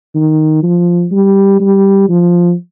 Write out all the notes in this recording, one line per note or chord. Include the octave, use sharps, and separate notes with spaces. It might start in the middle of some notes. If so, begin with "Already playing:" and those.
D#3
F3
G3
G3
F3